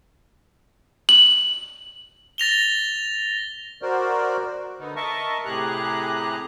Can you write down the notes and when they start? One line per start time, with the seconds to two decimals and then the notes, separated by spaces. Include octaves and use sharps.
1.09 F#7
2.38 A6 A#6 F7 G7
3.82 F#4 A#4 C5 D5
4.78 D3 B3 D#4
4.96 A#4 D#5 E5 A5 C#6
5.45 A2 C3 G4 G#4 A#5 F#6